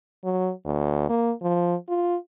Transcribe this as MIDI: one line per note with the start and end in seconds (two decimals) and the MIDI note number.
0.24 0.51 54
0.65 1.09 38
1.09 1.32 58
1.42 1.75 53
1.89 2.16 65